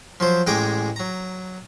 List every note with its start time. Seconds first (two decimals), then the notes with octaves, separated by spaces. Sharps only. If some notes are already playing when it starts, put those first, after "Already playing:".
0.20 F3 F#3 C5
0.47 A1 G#3 G5 G#5 A#5 D6
0.96 F#3 A#5